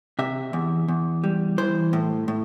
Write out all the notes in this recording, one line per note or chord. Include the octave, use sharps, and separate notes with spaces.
C3 E5
E2
E2
G3
E3 C5
A2
A2